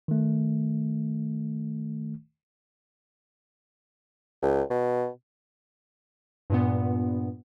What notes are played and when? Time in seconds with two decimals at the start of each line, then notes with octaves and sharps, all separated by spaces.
0.08 D#3 A3
4.42 C#2
4.70 B2
6.50 G2 A#2 B3